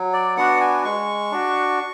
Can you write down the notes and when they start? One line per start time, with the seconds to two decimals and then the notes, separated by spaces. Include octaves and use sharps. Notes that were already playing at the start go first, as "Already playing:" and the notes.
Already playing: F#3
0.13 D5
0.37 B3 D4 F#4 F#5
0.61 G#5
0.85 G#3 C#6
1.32 D4 F#4